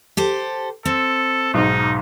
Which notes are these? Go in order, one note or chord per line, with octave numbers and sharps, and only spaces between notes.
G4 A4 C5
C4 A4
B1 G#2 D#4